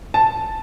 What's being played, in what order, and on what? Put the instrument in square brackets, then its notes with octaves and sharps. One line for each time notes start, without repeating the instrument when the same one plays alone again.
[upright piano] A5